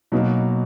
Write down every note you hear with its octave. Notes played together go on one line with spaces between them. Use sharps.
B2 F#3 A#3 D#4 F#4